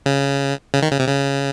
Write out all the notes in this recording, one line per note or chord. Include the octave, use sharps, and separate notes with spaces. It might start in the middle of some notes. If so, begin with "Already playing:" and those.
C#3
C#3
D#3
C#3
C3
C#3